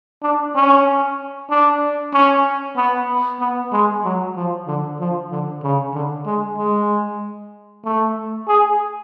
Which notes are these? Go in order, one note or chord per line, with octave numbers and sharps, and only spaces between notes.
D4
C#4
D4
C#4
B3
B3
G#3
F#3
F3
D3
F3
D3
C#3
D3
G#3
G#3
A3
G#4